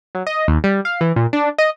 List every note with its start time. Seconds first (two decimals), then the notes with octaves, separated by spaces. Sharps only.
0.15 F#3
0.27 D#5
0.48 D#2
0.64 G3
0.85 F5
1.01 E3
1.16 A#2
1.33 D4
1.58 D#5